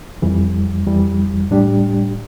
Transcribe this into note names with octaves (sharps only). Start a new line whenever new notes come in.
F2 E3 G3
F2 E3 G3
A2 G3 D4 G4